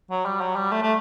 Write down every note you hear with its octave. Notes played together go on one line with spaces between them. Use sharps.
F#3
G3
F#3
G3
A3
A3